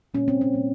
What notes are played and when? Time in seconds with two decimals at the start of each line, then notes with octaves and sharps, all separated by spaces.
0.14 A#2 G3 A#3 C#4
0.28 C4
0.41 C#4
0.53 A#2 G3 A#3